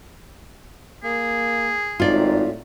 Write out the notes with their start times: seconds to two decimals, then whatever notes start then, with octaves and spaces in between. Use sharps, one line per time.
1.04 A#3 G#4
2.00 G#1 A2 D#4 F4 D5